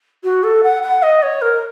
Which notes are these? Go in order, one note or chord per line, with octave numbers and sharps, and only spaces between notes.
F#4
A4
F#5
F#5
D#5
C#5
A#4